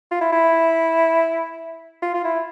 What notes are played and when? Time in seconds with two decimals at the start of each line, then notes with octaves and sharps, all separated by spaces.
0.12 F4
0.21 E4
0.33 E4
2.02 F4
2.14 F4
2.25 E4